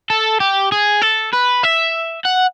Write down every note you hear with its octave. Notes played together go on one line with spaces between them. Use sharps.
A4
G4
G#4
A4
B4
E5
F#5